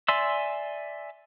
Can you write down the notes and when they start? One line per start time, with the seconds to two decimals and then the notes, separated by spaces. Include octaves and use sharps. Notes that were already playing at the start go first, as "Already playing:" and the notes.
0.08 D5 E5 G#5 C6 E6